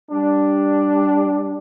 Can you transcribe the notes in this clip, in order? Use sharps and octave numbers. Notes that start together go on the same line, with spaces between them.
G3 D4